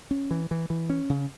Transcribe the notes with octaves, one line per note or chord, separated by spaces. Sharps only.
C#4
E3
E3
E3
C#4
C#3